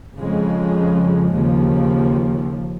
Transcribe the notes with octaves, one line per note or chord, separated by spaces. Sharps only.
F2 C#3 F3 G#3
D#2 C#3 F3